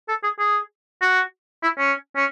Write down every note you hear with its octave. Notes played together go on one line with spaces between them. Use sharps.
A4
G#4
G#4
F#4
E4
C#4
C#4